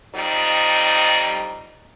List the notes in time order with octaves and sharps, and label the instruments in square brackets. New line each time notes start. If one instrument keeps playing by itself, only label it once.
[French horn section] F2 G3 D#4